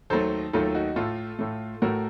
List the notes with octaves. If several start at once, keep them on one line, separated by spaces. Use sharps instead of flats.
D#2 D#3 F#3 A3 A4 C5
D#2 D#3 F#3 A3 F4 A4
D#4 F#4
A2 A3 F4 A4
A2 A3
A2 A3 F#4 A#4